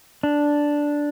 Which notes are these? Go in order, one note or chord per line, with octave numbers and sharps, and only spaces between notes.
D4